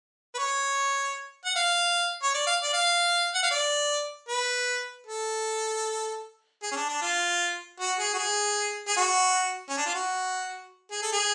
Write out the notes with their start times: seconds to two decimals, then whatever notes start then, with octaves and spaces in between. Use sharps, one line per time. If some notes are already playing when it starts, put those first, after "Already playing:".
0.35 B4
0.38 C#5
1.45 F#5
1.56 F5
2.23 C#5
2.35 D5
2.47 F5
2.63 D5
2.73 F5
3.35 F#5
3.43 F5
3.51 D5
4.29 B4
5.07 A4
6.63 G#4
6.72 C#4
6.76 D4
6.89 D4
7.02 F4
7.80 F#4
8.00 G#4
8.14 F#4
8.19 G#4
8.88 G#4
8.97 F#4
9.69 C#4
9.78 D4
9.86 F4
9.95 F#4
10.92 G#4
11.03 A4
11.13 G#4